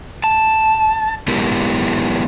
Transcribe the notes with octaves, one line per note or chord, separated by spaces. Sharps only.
A5
G#3 B3 E4 G4 A#4